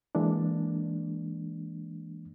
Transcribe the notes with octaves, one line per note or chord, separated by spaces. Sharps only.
E3 G#3 A#3 D4